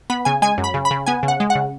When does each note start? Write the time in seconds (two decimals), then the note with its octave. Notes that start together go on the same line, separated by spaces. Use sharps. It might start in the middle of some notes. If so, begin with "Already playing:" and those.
0.10 B3 B5
0.25 C#3 G#5
0.42 G#3 G#5
0.58 F#2
0.64 B5
0.74 C#3
0.85 B5
0.91 C#3
1.06 B3 G#5
1.23 C#3
1.28 F#5
1.40 G#3
1.50 F#5
1.55 C#3